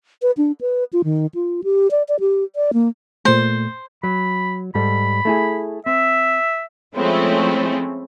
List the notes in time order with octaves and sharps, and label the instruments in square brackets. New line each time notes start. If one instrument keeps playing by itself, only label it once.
[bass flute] B4
D4
B4
F4
D#3
F4
G4
D5
D5
G4
D5
A#3
[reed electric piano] A#2 A3 [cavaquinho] C5
[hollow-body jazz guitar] F#3 [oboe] B5
[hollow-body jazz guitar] G#2 G3 A4 [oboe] B5
[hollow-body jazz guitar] A3 E4 G#4
[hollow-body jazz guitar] C4 [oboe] E5
[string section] F3 G#3 A3 C4 C#4 E4